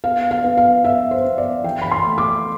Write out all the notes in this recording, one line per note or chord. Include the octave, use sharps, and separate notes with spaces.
B3 F5
F5
B3
F5
B3 E5
C5
B3
D5
E3 G5
B5
C6
A3
D6